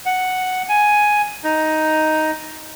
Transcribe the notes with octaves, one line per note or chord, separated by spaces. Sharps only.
F#5
G#5
D#4